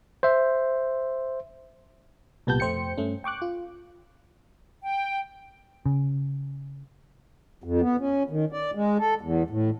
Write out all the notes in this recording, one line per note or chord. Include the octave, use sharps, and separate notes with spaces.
C5 E5
C2 A#2 B3 G4 A5 G6
F2 A3 C5 G5 C#7
G2 A3 C#4
G5 C#6 D6 F#6
F4
G5
C#3
F2
B3
C#4
D#3
D5
G#3
A4
E2
A2